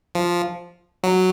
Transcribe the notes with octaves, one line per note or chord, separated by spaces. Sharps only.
F3
F#3